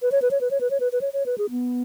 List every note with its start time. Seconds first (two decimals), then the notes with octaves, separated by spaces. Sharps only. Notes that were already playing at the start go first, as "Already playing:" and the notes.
0.02 B4
0.12 C#5
0.22 B4
0.31 C#5
0.41 B4
0.51 C#5
0.61 B4
0.71 C#5
0.80 B4
0.92 B4
1.01 C#5
1.13 C#5
1.26 B4
1.38 G#4
1.50 B3